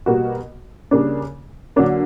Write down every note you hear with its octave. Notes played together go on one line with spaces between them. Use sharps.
B2 G3 A#3 F#4
C#3 G3 A#3 D4
D3 F#3 A#3 D4